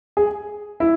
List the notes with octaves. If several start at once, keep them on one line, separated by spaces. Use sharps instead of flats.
G#4
E4